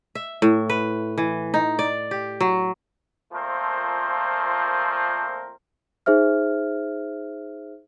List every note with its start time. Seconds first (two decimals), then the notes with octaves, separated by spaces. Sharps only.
0.15 E5
0.42 A2
0.69 B4
1.18 E3
1.54 D#4
1.79 D5
2.11 G4
2.40 F#3
3.33 A#2 F3 A3 C4 A#4 C5
6.06 D#4 G#4 C5 E5 F6